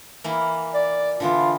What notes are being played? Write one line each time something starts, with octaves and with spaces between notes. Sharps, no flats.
E3 A#3
D5
D3 E3 B3 F4